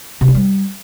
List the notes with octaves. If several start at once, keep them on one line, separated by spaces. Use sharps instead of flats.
C3
D4
G3